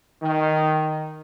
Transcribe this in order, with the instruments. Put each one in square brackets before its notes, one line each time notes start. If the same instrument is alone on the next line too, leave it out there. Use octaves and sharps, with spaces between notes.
[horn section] D#3